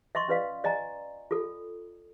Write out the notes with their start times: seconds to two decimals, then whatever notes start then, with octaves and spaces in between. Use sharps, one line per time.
0.15 D#5 E5 C6 C#6
0.28 C#4 F4 B4 D5 D#5 F5
0.64 D5 D#5 G#5 A#5
1.31 F4 A4